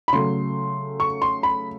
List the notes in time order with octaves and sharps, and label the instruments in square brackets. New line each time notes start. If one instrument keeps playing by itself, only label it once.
[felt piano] B5
C#3 F#3 A3 C6
C#6
C6
B5